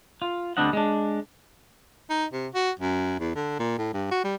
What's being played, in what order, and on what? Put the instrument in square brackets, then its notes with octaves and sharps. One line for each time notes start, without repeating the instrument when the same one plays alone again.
[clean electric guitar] F4
D2 G3 C4 D4 D#5 F#5
G#3 D4
[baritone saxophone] D#4
C3
F#4
F#2
E2
D3
A#2
A2
G2
F#4
G3